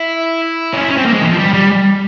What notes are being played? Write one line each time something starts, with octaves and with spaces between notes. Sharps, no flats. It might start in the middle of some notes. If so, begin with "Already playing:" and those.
Already playing: E4
C#4
E4
C#4
C4
A#3
G#3
E3
F3
G3
G3